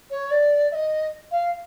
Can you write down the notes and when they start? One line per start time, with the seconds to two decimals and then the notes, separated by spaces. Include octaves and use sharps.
0.10 C#5
0.31 D5
0.71 E5
0.75 D#5
1.31 F5